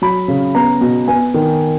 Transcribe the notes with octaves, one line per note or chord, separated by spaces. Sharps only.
F#3 B5
C#3
B3 A#5
B2
B3 G#5
D#3